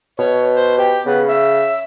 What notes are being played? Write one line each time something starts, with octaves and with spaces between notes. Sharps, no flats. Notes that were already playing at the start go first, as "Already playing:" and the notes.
B2 C#5
C5
G4
C#3 B3
E5